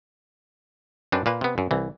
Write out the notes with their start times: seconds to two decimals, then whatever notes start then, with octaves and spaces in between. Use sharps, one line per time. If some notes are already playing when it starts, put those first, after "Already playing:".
1.12 F#2 C4 D4 B4
1.26 A#2 A#3 B4
1.41 C3 B3
1.58 F#2
1.71 C2 E3